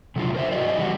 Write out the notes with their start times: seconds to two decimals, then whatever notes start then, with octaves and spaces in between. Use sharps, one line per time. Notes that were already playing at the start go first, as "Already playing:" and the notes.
0.16 C3 F#3 A3 D4 F4
0.35 A#4 C5 E5
0.51 F#4 G4 D5 D#5
0.77 E3 G3 F#4